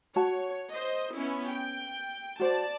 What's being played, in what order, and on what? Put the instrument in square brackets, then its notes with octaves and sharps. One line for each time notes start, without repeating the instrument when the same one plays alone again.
[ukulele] F#4 A5 [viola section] C#5
[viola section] C5 D#5
B3 C#4 E4
G5
[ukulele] F#4 C5 [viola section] D5 A5